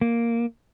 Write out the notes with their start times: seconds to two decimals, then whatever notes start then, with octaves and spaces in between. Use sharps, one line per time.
0.01 A#3